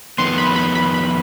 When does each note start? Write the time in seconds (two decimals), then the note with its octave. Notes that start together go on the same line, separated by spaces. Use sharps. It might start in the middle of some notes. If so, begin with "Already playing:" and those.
0.18 F2 D#3 B3 C6
0.38 B5
0.56 B5
0.75 B5
0.94 B5